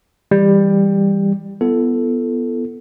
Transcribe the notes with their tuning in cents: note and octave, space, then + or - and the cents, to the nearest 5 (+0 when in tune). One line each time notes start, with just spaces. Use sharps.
E3 +5 G3 +15
B3 +0 E4 +45 A4 +0